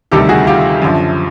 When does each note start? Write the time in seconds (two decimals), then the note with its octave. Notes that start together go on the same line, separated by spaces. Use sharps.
0.12 D2 C3 D#3 G3 G4 A4
0.29 F#4 G#4
0.47 F4 G4
0.82 F#2 D3 F3